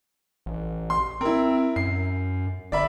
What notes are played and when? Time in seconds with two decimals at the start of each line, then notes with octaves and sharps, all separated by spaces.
0.46 A1
0.90 C6
1.21 C4 E4 A#4
1.76 F#2 C7
2.72 G1 D5 E5 B5